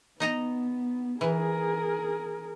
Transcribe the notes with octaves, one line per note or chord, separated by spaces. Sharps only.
B3 D#4 D#5 A#5
E3 G#4 A#4